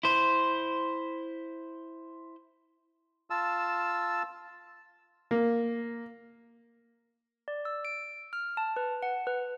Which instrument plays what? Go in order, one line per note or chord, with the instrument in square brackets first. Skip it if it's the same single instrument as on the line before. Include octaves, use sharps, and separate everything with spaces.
[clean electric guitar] E4 C5
[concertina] F4 A5 E6
[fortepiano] A#3
[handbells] D5
E6
D7
F6
A5
B4
F#5
B4